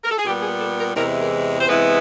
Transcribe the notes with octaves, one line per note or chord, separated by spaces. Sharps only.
A#4
A4
G#4
A#2 G3 B3 G4
G#4
A4
A#4
E2 C3 E3 G#3 A#4
A#4
C5
C3 E3 G#3 B3 E4 B4